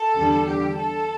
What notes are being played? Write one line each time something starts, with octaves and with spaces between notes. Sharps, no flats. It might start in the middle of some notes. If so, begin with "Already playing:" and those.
Already playing: A4
E2 D3 G3
G4
A4